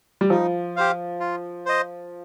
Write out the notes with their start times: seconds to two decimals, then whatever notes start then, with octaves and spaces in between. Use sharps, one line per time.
0.21 G3
0.30 F3 D#4
0.76 G4 C5 F5
1.20 F4
1.66 C5 D#5